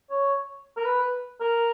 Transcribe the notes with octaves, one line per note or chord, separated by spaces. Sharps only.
C#5
A#4
B4
A#4